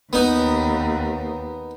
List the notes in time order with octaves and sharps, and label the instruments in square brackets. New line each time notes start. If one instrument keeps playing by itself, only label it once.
[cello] D#2 [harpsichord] B3 D#4